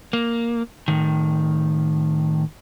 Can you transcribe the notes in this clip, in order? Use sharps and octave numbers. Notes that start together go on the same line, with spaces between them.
A#3
A2 D#3